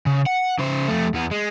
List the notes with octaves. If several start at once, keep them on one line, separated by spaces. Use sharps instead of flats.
C#3
F#5
C#3 C5
F2 A3
E2 B3
G#3